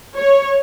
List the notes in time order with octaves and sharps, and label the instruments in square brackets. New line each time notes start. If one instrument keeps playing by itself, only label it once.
[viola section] C#5